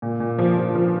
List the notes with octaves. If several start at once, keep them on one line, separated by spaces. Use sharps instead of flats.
A#2
A#2
F3
F3
F3